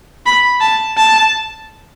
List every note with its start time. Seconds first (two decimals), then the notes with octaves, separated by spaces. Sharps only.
0.26 B5
0.61 A5
0.97 A5